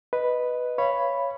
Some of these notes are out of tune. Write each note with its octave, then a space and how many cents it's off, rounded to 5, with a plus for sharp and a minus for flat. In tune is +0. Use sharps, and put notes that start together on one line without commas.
B4 +0 D#5 +0
C#5 +0 F5 -35 B5 +0